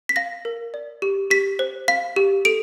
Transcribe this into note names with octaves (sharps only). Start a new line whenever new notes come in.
B6
F5 A#6
A#4
D5
G4
G4 B6
C5
F5 B6
G4
A4 D7